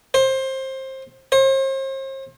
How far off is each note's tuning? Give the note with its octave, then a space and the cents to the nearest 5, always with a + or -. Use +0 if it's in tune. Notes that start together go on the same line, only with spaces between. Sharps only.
C5 +20
C5 +40